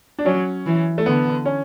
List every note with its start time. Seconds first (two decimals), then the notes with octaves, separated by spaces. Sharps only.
0.19 D4
0.25 F#3 C#4
0.66 E3
0.98 A3
1.06 D3 B3
1.46 C#4